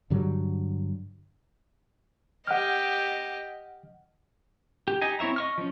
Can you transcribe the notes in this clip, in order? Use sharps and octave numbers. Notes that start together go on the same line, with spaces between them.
G2 D3 F#3 G3
G4 D#5 F#5 F6
G4
D#4 G4 D#5 G#5
C4 E4 C#5 E5 A#5
D#5 C#6 F6
F3 C#4